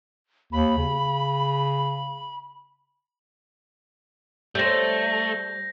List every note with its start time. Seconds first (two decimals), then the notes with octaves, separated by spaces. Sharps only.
0.53 D#2 B5
0.78 C#3
4.55 G3 A3 C4 G6 A#6